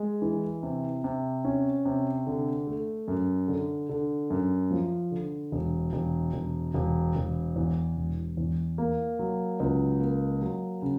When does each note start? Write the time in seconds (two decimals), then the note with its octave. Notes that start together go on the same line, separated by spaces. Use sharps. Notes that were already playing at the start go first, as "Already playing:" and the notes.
Already playing: G#3
0.22 E3
0.63 C3
1.04 C3
1.45 C#4
1.85 C3
2.27 D3
2.67 A3
3.08 F#2
3.48 D3
3.89 D3
4.30 F#2
4.71 F3
5.11 D3
5.52 E1
5.93 E1
6.33 E1
6.74 E1
7.15 E1
7.56 E2
7.96 E1
8.37 E2
8.78 A#3
9.19 F#3
9.60 C#2
10.00 A#3
10.41 F#3
10.82 C#3